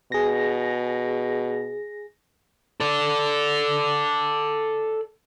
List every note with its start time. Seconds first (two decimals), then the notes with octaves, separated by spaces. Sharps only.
0.12 B2 G#4 A#6
2.80 A4 D5